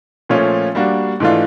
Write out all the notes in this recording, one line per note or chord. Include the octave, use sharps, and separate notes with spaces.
A#2 F3 A3 C#4 F4
G3 A#3 D4 F#4
G#2 E3 A3 D4 F4